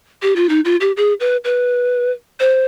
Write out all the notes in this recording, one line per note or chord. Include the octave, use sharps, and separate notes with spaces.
G4
F4
D#4
F4
G4
G#4
B4
B4
C5